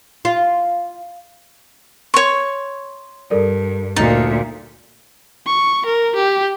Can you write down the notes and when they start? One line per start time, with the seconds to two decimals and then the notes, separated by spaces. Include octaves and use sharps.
0.25 F4
2.14 C#5 C6 C#6
3.31 G2 A4 A#4 D5
3.96 D2 A#2 D#4 A4 A6
5.46 C#6
5.86 A#4
6.16 G4